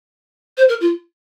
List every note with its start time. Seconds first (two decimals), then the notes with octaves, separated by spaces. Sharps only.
0.57 C5
0.69 A#4
0.81 F4